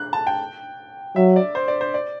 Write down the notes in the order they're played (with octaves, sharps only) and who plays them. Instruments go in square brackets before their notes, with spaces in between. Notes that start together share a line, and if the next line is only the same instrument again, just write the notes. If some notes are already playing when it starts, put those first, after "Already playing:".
Already playing: [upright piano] F#6
A5
G5
[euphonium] F#3 [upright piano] E5
[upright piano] D5
C5
D5
C5
D5